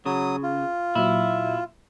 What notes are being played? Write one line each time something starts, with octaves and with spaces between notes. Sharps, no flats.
C#3 F#3 D#6
F4
A#2 F#3 E4